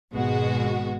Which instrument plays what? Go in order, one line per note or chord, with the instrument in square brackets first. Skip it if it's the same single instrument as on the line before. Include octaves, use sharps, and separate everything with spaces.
[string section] G#1 B2 G#3 F#4